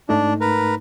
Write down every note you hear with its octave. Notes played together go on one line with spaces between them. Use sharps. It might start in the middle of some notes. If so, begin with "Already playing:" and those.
G#2 A3 D4 D#4
A#4 B4